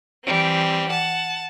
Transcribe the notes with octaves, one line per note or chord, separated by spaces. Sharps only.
E3 G3 C4
F#5 A5